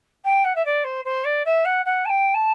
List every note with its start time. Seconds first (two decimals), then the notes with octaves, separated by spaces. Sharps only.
0.25 G5
0.45 F#5
0.56 E5
0.65 D5
0.84 C5
1.05 C5
1.25 D5
1.46 E5
1.65 F#5
1.86 F#5
2.05 A5
2.09 G5
2.34 A5